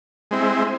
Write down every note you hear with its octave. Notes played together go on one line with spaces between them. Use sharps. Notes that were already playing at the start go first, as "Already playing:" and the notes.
G#3 C4 E4